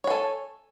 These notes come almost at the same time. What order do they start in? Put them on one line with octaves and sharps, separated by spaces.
C#5 G#5 A4